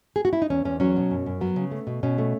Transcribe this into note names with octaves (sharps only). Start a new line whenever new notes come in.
G#4
F#4
E4
D#4
E2 C#4
E2 C#4
F#3 C#4
B2
F#2
F#2
F#3 B3
C#3
A3
B2
B2 C#4
A3